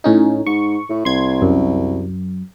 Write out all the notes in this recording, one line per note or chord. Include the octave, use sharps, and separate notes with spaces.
A2 C#4 D#4
G#2 C#6
A2
C2 C6 G#6
F#2